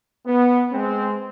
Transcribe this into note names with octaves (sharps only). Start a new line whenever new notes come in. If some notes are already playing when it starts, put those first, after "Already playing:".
B3
G#3 C4